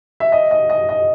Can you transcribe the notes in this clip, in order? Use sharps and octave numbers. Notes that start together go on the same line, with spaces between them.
E5
D#5
D#5
D#5
D#5